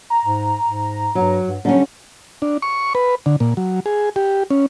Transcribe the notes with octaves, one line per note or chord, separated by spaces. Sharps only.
A#5
G#2
G#2
G2 F#3
G2
D3 F#3 G3 C#4
D4
C#6
B4
D3
A#2
F#3
G#4
G4
C#4